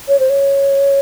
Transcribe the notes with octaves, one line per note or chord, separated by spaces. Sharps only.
C#5
C5
C#5